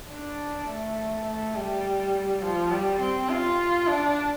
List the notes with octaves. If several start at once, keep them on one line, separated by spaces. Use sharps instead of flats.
D4
A3
A3
G3
F3
G3
C4
F4
D4